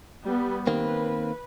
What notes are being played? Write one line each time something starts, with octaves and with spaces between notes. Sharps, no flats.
G3 B3
D#3 A#3 C4 B4